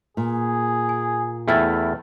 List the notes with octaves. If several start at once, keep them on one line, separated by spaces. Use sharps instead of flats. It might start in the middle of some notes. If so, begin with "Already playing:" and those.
A#2 G#4
G#5
E2 A3 E4 G5 F6 A6